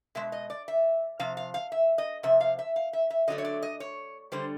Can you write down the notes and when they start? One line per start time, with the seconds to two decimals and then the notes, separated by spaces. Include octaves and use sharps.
0.15 B2 G#3 E5
0.32 D#5
0.50 D5
0.68 E5
1.20 C3 F3 F5
1.37 F5
1.54 F5
1.72 E5
1.98 D#5
2.23 C3 F3 E5
2.40 F5
2.59 E5
2.76 F5
2.93 E5
3.10 E5
3.28 D3 F#3 A3 D#5
3.38 C#5
3.45 D5
3.63 D#5
3.80 C#5
4.32 D3 G3 C5